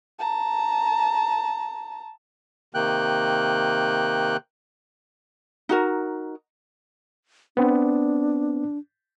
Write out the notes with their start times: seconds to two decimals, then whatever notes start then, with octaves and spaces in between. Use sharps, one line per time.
0.19 A5 A#5
2.74 C3 D#3 A#3 G5 F#6
5.69 D#4 F#4 A#4
7.57 B3 C4 D4